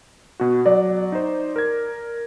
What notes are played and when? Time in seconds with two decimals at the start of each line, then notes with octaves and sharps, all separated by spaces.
0.40 B2 F#4
0.66 F#3 D5
1.12 D#4 C5
1.56 A#4 G#6